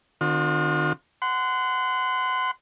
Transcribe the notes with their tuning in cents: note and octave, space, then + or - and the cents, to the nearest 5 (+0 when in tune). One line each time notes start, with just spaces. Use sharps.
D#3 -40 C4 +0 F4 +45
F#5 +0 C6 -30